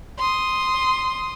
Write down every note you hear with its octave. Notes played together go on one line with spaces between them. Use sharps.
C6 D#6